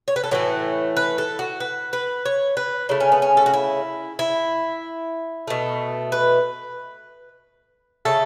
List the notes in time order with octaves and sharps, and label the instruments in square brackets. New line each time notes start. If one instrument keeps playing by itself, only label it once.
[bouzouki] C#5
B4
A4
A2 E3 A3 F#4
B4
A4
F#4
B4
B4
C#5
B4
C#3 A3 E4
C#4
B3
C#4
A4
F#4
E4
E4
B2 A3
B4
C#3 A3 A4